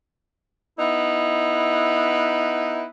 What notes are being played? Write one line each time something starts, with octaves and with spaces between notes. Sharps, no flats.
B3 D#4 E4